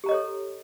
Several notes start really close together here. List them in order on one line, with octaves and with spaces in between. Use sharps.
G4 A#5 D#5 C#5 A4